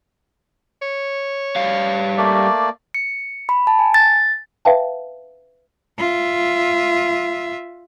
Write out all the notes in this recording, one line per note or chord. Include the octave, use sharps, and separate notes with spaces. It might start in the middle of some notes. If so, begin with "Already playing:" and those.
C#5
G3 F5
A3 A#3 D5
C#7
B5
A5
G#5
A6
B4 E5 F5 G5 A5
F4 E5